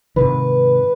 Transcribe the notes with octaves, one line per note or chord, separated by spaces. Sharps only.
G#2 C3 D#3 B4